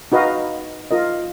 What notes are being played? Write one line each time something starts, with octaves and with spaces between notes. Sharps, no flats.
D#4 F#4 B4 D#5 F5
F4 A#4 D#5